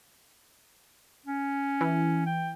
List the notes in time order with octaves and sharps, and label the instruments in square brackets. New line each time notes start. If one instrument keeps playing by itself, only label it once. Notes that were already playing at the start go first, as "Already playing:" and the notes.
[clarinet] C#4
[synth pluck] E3
[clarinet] G5